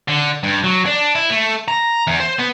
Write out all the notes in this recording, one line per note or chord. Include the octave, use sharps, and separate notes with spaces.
D3
G2
F#3
D4
E4
A3
A#5
E2
C5
B3